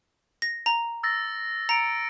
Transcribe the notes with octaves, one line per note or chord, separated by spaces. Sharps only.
A#6
A#5
E6 A6 A#6
A#5 C#7 D7